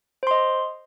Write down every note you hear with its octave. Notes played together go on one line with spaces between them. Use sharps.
C5 D#5 C6